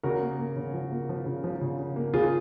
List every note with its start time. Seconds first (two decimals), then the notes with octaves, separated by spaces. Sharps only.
0.03 C#3 F#4 A#4
0.21 A#3
0.39 A#3
0.56 C#3
0.74 F3
0.91 A#3
1.09 F3
1.26 C#3
1.44 F3
1.61 C#3
1.79 C#3
1.96 A#3
2.14 C#3 F4 G#4